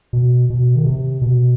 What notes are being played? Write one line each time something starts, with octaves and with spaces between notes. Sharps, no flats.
B2
B2
D#3
C3
B2